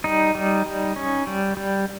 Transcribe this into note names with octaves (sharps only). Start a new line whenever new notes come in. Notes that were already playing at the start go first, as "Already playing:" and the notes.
G3 D#4
G3
G3
C#4
G3
G3